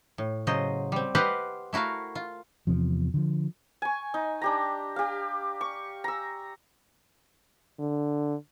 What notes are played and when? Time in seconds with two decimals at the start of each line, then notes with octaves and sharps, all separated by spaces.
0.18 A2
0.47 C#3 F#3 C5 D#5
0.92 G3 C4
1.15 G4 B4 C5 D#5 F5 F#5
1.73 A3 E4 F#4 A#4 F5
2.15 F4
2.67 E2 C3 F3
3.14 D3 F3
3.82 G#5 C#6
4.14 D#4
4.42 D4 G4 A#5
4.96 G4 F5
5.61 C#6
6.04 A#5 E6
7.79 D3